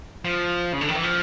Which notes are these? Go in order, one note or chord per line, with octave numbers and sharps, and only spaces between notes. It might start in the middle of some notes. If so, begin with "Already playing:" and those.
F3
C#3
D3
D#3
E3
F3